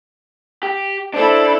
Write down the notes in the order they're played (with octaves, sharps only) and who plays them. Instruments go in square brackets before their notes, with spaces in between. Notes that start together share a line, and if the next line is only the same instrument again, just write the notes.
[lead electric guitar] G4
[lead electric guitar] D4 [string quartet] E4 A4 C5